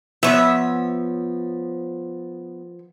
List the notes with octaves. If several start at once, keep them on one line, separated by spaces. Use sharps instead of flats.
F3 B3 C#5 E5